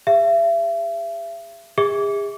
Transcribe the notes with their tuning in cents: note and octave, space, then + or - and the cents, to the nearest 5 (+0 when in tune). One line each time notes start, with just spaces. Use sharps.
G#4 -45 E5 +35
G#4 -40 E5 -25 D6 -30